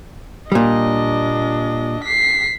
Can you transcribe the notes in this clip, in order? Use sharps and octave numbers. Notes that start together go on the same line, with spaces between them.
A#2 G3 D4 D#5
B6 C7